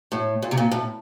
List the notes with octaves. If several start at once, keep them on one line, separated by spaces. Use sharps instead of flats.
A2
A#2
C3
A#2
A2